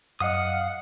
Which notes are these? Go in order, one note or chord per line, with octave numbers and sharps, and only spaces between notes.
F#2 D#5 F5 F#5 D#6